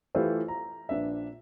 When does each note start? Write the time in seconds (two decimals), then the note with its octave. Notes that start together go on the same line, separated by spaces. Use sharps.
0.15 E3 A3 F4 G4 B4 C5
0.48 A#5
0.89 A#1 D4 B4 E5